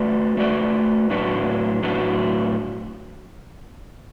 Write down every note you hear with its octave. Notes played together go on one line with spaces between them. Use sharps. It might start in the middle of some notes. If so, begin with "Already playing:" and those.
Already playing: A3 F#4 B4 D5
A3 F#4 B4 D5
A2 F#3 D4 F#4 B4
A2 F#3 D4 F#4 B4